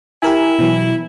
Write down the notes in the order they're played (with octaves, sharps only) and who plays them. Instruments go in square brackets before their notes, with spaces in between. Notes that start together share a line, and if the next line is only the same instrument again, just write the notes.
[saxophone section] E4 [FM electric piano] G4 A#4 G#5
[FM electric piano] B2 E3 F#3